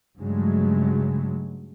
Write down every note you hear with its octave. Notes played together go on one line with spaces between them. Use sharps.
G2 C#3 F#3 G#3 A3